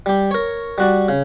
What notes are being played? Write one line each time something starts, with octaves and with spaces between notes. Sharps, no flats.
G3 G4
A#4 C#5
G3 F#4 D5
C#3